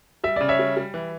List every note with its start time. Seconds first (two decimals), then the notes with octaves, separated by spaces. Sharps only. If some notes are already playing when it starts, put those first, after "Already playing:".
0.24 G3 E5
0.36 C#3 D5
0.48 C#5 E5
0.59 G3
0.77 G3
0.94 E3